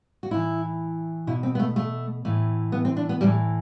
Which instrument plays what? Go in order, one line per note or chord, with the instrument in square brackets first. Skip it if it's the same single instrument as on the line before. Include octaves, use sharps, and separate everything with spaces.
[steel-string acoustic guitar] F#4
A2 E3 E4
B2 E4
C4
B3
A3
A3
A2 E3
B3
C4
D4
B3
A2 E3 G3